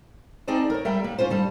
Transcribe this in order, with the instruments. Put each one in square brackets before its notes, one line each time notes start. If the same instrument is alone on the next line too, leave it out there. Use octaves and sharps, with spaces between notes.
[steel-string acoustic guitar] C4 D#4 G#4 D5 G5 A5
A#4 C#5
G3 E5 G5 A#5
A#3
C#4 F4 C5
G2 G3 A5